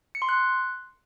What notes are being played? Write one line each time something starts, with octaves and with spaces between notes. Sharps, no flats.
C#7
C6
F#6